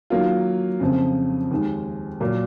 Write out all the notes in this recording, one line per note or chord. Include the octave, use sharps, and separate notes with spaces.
D#3 F#3 A#3 F4
F2 C#3 F3 C4
D#2 D#3 G#3
A#2 F#3 A#3